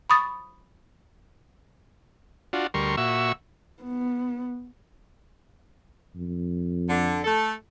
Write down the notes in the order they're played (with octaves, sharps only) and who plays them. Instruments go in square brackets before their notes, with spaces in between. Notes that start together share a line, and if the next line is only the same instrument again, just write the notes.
[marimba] B5 C#6 D#6 A6
[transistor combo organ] D4 F4 F#4
D2 G3 A#4 C6 C#6
A#2 F#4 E5 C#6 E6
[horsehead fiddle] B3
[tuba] F2
[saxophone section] D3
A3 A4